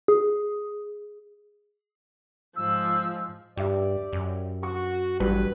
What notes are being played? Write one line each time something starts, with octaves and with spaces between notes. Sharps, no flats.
G#4
G#2 F3 E6
G2 G4 D5 E5
F#2
F#4 C#6
A1 G2 F#3 B4